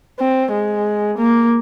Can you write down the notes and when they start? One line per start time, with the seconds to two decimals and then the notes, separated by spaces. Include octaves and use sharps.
0.19 C4
0.52 G#3
1.18 A#3